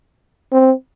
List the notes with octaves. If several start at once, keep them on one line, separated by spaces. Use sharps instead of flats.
C4